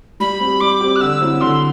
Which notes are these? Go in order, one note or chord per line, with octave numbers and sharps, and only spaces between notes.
G3 B5
C4 G4
G3 D6
C4 G4
F#6
D3 E6
F#3 C4 E4
D3 C6